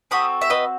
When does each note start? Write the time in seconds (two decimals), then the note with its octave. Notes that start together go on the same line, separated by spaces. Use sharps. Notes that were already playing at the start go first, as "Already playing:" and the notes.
0.11 C4 F#4 A4 B5 D#6
0.41 E5
0.50 B4 D#5